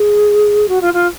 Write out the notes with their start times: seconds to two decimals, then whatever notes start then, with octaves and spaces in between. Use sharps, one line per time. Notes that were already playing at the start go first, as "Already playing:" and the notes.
Already playing: G#4
0.68 F#4
0.81 F4
0.93 F4